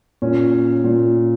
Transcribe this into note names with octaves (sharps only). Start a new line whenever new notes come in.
A#2 C#4
A#2